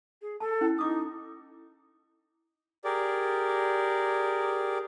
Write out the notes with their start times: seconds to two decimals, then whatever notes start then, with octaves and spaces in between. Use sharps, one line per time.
0.22 G#4
0.40 A4 A5
0.61 C#4 E4 G5
0.78 D#4 D6 D#6
2.84 G4 G#4 A#4 D5